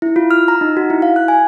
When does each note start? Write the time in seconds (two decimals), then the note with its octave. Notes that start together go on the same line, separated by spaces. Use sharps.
0.02 E4
0.16 F4
0.31 F6
0.48 A#5
0.61 D#4
0.77 F#4
0.90 E4
1.02 F5
1.16 F#6
1.28 G#5